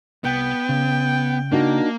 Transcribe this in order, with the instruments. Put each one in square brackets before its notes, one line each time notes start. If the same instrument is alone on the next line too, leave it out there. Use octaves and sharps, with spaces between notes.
[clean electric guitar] C2 [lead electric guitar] B3 [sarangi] G5
[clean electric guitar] C#3
[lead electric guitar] A#3 [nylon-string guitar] D4 D#4 F#4